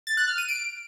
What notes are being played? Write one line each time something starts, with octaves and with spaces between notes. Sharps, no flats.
A6
F#6
F6
D#7
D7